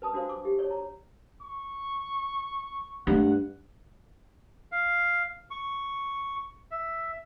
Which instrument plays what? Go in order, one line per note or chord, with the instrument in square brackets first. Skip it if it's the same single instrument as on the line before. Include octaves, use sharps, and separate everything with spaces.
[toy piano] B4 A5 D#6
D4 F#4 C5 F5
D6
G4
C#5 D5
A#5
[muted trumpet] C#6
[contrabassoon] G2 [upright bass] A3 [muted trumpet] F#5
[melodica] F5
C#6
E5